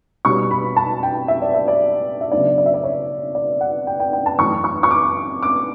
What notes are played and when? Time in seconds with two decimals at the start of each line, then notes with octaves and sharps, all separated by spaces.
0.25 B2 G3 C#4 C#6
0.51 B5
0.76 A5
1.03 G5
1.28 E5
1.42 D5
1.54 E5
1.68 D5
2.21 E5
2.31 C#3 F#3 B3 D4 D5
2.58 D5
2.66 E5
2.74 D5
2.83 C#5
3.35 D5
3.61 F#5
3.87 G5
4.00 G5
4.13 G5
4.26 A5
4.38 F#2 E3 A3 C#4 C#6
4.64 C#6
4.83 C#6
4.91 D6
5.42 D6